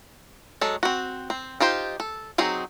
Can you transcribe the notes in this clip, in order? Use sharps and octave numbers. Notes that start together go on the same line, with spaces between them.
F#3 G#3 A4
C4 F#4
C4
D#4 F4 G4 C5
A4
F#3 C4 D#4 G#4